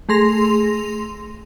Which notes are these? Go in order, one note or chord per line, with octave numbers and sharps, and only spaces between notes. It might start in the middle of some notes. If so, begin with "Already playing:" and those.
A3 G#4 C6 A#6 F7